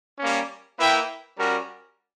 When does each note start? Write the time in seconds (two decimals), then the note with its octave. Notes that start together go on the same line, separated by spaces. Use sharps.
0.19 G3 A#3 C#4
0.78 A#3 E4 B4 E5 G5
1.36 G3 C#4 F#4 A#4